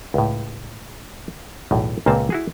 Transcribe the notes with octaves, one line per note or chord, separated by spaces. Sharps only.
C#2 A2
B1 E2 A2
C#2 A#2 A#3 C4 A5
E4 F#4 G#4